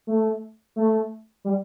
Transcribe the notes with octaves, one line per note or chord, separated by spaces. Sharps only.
A3
A3
G3